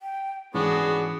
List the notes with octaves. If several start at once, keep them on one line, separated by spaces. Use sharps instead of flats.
G5
G#2 E3 B3 C#4 D4 F#4 G#4